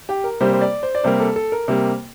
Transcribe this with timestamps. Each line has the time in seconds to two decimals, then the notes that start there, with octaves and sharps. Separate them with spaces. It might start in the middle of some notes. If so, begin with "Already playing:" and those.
0.09 G4
0.24 A#4
0.41 C3 G3 A#3 C5
0.53 C5
0.61 D5
0.83 C5
0.95 D5
1.04 C3 G3 A#3 C5
1.20 A4
1.36 A4
1.52 A#4
1.68 C3 G3 A#3